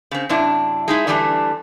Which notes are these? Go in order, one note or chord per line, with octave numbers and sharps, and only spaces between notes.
C#3 C4
F#2 C3 D4 E4
G#3 D#4 E4
D3 E3 G3 A3 D4